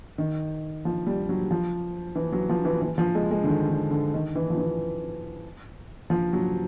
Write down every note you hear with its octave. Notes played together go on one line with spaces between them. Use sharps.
D#3
F3
G3
F#3
F3
E3
F#3
F3
E3
E3
F3
G#3
G#3
D3
D#3
D3
D3
D#3
E3
F3
E3
F3
F#3